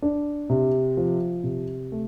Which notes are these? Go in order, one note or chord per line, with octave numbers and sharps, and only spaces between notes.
D4
C3
F3
C3
A3